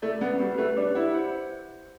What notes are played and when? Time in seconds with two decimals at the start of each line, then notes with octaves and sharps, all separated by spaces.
0.02 A3 D5
0.21 B3 B4
0.39 G3 F#4
0.58 A3 B4
0.77 D4 G4
0.95 E4 F#5
1.15 C5